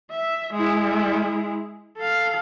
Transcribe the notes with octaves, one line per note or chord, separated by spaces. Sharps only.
E5
G#3 E4
A4 F5